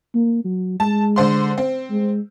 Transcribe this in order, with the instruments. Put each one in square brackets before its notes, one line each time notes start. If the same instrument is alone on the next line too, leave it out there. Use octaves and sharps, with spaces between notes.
[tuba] A#3
F#3
[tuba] G#3 [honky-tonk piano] A5
[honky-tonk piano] D3 C5 C6
C4
[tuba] G#3